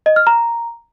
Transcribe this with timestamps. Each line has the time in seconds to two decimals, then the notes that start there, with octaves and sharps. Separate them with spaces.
0.06 D#5
0.16 F6
0.27 A#5